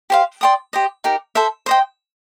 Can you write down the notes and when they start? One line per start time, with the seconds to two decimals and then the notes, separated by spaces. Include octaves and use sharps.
0.10 G4 C5 F5
0.41 D5 G5 C6 D#6
0.73 G4 C5 D#5
1.04 D#4 G4 A#4
1.35 A4 C5 E5
1.66 C5 D#5 G5